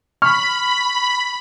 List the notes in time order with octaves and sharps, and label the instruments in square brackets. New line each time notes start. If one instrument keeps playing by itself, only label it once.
[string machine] B5 [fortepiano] C#6 F6